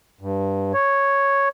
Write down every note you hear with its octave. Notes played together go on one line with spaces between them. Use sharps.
G2
C#5